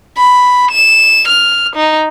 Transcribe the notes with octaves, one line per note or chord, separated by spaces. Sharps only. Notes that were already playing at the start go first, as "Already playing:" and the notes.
B5
E7
F6
D#4